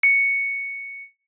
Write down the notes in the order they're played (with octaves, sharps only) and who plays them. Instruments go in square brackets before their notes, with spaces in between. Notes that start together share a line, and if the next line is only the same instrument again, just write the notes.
[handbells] C#7